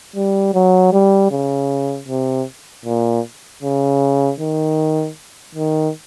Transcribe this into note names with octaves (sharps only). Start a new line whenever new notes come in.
G3
F#3
G3
C#3
C3
A#2
C#3
D#3
D#3